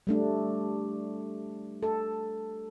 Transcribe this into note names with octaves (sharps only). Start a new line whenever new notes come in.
G3 A3 D4
A4